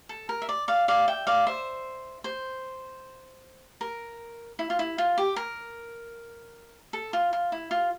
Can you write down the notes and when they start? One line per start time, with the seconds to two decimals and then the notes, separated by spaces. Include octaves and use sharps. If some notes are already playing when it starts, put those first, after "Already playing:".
0.09 A4
0.29 A#4
0.42 E5
0.49 D5
0.68 D5 F5
0.88 D5 F5
1.08 E5 G5
1.27 D5 F5
1.47 C5 E5
2.24 C5
3.81 A#4
4.59 E4
4.70 F4
4.79 E4
4.98 F4
5.18 G4
5.36 A#4
6.93 A4
7.13 F4
7.33 F4
7.52 E4
7.71 F4